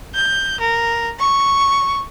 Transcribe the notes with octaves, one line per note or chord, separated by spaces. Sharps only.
G6
A#4
C#6